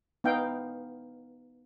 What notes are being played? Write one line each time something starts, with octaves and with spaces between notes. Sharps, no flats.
B3 D#4 F5 G5